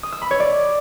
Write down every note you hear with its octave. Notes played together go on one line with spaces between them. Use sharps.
D#6
E6
B5
C#5
D5